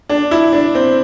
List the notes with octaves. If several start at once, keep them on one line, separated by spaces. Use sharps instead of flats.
D4
E4
D4
C4